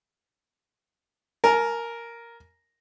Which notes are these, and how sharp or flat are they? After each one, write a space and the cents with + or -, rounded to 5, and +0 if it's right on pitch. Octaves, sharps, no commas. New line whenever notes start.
A#4 +0 G#5 +40